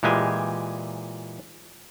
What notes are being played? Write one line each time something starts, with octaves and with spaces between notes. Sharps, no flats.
A#2 E3 G#3 G4 G#5